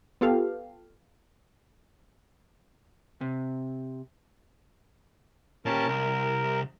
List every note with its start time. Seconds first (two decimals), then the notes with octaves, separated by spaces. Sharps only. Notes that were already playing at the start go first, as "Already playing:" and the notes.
0.21 B3 F4 G4 A4 F5
3.21 C3
5.66 A#2 C#4 G4 A#4 A5
5.89 C2 A#4